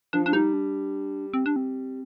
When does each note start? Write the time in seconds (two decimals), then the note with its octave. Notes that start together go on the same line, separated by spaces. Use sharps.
0.13 F3 D4
0.26 D4
0.33 G3 D#4
0.53 D4
1.34 C4
1.46 D4
1.56 C4